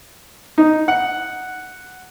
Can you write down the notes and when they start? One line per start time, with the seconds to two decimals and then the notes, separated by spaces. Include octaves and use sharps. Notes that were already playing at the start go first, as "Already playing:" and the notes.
0.58 D#4
0.88 F#5